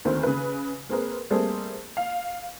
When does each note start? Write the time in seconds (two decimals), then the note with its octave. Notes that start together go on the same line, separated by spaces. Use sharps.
0.05 D2 D#3 C4
0.23 C#3 B4
0.89 A#3 C4 G#4 A#4 B4
1.30 G3 A3 A#3 C4 G#4
1.97 F5